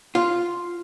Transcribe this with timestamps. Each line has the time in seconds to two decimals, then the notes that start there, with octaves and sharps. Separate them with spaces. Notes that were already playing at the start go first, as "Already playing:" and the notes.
0.15 F4